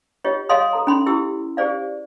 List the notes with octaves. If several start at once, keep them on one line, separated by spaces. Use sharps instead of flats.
F4 G4 C#5 D#5
G#4 C#5 D#5 F5 C6 D#6
A4 A#5
C#4 B5 C6
E4 G4 E6
G4 G#4 C5 D5 F5